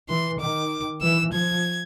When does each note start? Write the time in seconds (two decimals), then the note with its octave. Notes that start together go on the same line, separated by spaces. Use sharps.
0.09 E3 C6
0.40 D#3 D6
1.02 E3 E6
1.32 F3 G#6